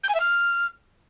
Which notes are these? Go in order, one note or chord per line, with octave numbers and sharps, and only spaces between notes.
G6
G#5
E5
F6